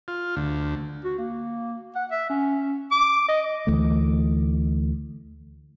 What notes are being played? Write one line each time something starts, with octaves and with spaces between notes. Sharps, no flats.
F4
D2
F#4
A#3
F#5
E5
C#4
D6
D#5
D2 E3 A3